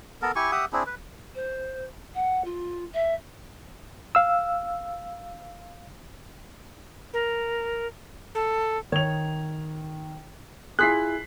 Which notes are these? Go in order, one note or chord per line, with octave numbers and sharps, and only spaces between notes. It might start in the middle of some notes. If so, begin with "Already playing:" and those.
B3 A4 A#4
E4 G4 G#5 C#6
G4 E5 F#5 D#6
C4 D4 E4 G#4
B4
C5
F#5
F4
E5
F5 E6
A#4
A4
D#3 C#5 F7
E4 F4 G#4 F#6 B6 C7